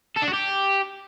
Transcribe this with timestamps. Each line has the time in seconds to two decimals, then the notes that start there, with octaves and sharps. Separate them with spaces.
0.17 A4
0.23 D4
0.28 F#4
0.34 G4